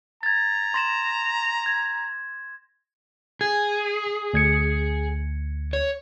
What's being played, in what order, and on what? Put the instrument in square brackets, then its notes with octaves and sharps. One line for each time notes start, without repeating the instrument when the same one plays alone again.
[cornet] A#5 [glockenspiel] G#6 A6
[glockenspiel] C6 A#6 E7
G#6
[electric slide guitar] G#4 [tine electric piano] G#6
[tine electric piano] D2 G#6 C#7
[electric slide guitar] C#5